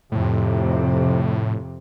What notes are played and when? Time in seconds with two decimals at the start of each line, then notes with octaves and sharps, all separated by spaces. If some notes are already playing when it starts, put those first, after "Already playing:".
0.12 F2 A2 C3